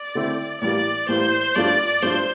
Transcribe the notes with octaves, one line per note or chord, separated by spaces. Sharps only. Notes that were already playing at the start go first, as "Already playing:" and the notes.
Already playing: D5
D3 A3 C4 E4
A2 E3 G3 A#3 D5
A2 E3 G3 A#3 C5
G2 F3 A3 D4 F4 D5
G2 F3 A3 D4 F4 C5